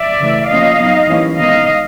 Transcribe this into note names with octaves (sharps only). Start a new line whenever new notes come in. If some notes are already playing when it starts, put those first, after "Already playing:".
Already playing: D5 E5
C#3 E3 A3
F3 A#3 C#4 F4 D#5 F5
F#3 B3 D#4
E3 G3 A#3 C#4
D#3 G#3 B3 D#4 D#5 F5